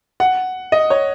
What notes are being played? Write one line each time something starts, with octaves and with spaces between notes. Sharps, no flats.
F#5
D#5
C#5